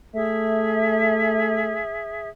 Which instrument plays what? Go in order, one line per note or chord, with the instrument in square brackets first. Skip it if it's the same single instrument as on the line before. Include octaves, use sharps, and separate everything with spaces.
[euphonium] A3 [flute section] G#4 E5